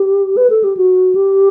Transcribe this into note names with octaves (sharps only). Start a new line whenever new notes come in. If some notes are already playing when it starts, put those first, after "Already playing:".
Already playing: G4
B4
A4
G4
F#4
G4